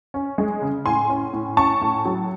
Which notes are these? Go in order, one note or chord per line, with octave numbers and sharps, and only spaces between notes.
C#4
G#3
C#3
A2 G#5 C6
C#4
A2
C#4 A5 C#6
A2
F#3